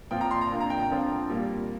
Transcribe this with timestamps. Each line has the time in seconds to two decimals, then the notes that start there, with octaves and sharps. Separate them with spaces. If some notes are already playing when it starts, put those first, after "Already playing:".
0.11 A#2 F3 C4 F4 G5
0.21 A#5
0.31 C6
0.41 A#5
0.51 C3 A#3 D4 F4
0.60 A#5
0.70 G5
0.79 A#5
0.89 D3 F3 C4 F4
1.29 A#2 G3 A#3